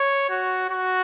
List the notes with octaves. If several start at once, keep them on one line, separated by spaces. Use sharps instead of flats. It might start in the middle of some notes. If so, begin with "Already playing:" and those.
Already playing: C#5
F#4
F#4